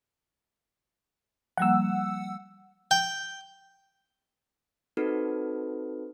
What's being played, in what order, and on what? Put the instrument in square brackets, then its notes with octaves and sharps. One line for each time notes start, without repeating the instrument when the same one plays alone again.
[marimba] F3 G3 A#3 [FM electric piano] F#5 E6
[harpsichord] G5
[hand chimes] C4 D#4 F#4 A4 B4